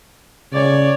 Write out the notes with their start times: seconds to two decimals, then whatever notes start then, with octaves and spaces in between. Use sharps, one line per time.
0.53 C#3 C#5 D5